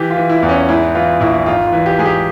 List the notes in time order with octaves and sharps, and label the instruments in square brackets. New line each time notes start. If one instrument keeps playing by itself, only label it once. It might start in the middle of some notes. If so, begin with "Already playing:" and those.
Already playing: [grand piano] E3 G4
F4
E3
E4
E2
C#4
G#2 E4
E3 F4
A#1 E4
G#1 F4
F4
E3
G4
G#2 G#4
G4